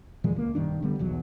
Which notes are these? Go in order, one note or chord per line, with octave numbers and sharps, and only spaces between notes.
A#2 E3 F3 G#3
C#2 A#3
B1 G2 D#3 D4
D3 G3 B3
B1 E2 F#3